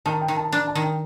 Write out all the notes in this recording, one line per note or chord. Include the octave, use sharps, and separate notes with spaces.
D#3 A5
G5
D#3
A5
A5
D4 A#5
A5
D#3
G5